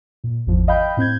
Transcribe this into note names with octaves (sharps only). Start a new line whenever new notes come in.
A#2
G#1 E2 F3
D#5 F5 G5 B5 G6
A2 C4 G6 G#6